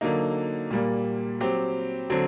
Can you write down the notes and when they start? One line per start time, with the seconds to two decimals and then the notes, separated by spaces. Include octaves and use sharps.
0.01 D3 F#3 A#3 D#4
0.70 A#2 G3 A#3
1.40 F#3 C4 G4
2.10 D3 F#3 C4